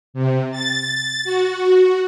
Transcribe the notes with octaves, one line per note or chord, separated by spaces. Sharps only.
C3
A6
F#4